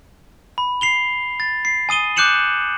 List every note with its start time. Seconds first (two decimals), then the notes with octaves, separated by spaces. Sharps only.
0.58 B5
0.81 C7 F7 G7
1.40 A6
1.65 C7
1.89 G#5 D#6 D#7 G7
2.16 D6 F#6 G6 C#7 E7 F#7